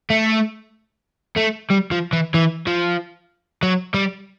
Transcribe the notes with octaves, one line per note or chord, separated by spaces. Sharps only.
A3
A3
G3
F3
E3
E3
F3
F#3
G3